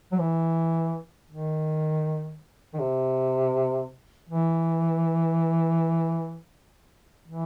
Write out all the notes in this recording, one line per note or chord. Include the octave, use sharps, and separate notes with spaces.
F#3
E3
D#3
D#3
C3
E3
E3